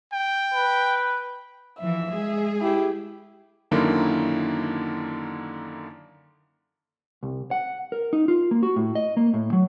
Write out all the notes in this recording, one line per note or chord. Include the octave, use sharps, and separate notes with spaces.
G5
B4
E3 F3 E5
G#3 G#4
E4 G4
F#2 D3 D#3 A#3 E4
C2
F#5
A#4
D#4
F4
A#3
F#4
A2
D#5
A#3
A2
F#3